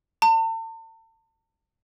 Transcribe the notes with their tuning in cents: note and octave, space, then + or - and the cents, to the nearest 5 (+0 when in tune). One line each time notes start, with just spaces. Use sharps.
A5 +40